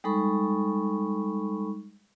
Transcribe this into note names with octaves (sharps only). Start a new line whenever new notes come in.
G3 G#3 D#4 A4 B5 C#6